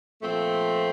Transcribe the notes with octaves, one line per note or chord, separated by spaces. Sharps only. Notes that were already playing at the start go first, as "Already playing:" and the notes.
A#2 F3 A3 C4